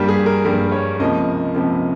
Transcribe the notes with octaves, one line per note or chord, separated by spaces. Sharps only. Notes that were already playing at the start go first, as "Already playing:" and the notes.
Already playing: G2 G3 A#3 G4
G#4
A#4
G2 G3 A#3 A#4
C#5
C#2 C3 F3 A#3 D#5
C#2 C3 F3 A#3